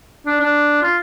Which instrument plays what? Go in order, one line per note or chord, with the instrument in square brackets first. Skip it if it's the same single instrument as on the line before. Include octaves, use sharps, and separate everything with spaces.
[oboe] D4
D4
F4